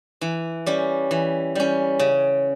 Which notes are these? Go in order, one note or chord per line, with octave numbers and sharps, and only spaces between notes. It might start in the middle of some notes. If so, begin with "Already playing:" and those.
E3
G3 C#4
E3
G3 C#4
C#3